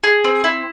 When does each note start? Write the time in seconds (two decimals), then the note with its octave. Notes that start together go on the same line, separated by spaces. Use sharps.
0.04 G#4
0.24 C4
0.44 E4